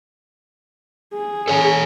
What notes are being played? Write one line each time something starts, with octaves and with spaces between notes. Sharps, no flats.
G#4
A4 C#5 G#5